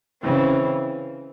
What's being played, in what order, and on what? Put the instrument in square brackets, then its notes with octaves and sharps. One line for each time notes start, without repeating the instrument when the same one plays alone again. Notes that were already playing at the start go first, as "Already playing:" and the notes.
[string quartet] C#3 E3 C4